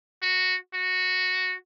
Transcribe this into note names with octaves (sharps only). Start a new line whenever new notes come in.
F#4
F#4